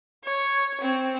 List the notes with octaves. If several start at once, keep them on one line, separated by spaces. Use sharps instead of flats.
C#5
C4